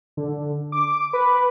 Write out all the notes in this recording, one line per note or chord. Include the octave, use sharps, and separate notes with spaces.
D3
D6
B4